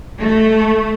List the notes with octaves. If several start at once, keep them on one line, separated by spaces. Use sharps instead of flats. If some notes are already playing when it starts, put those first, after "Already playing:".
A3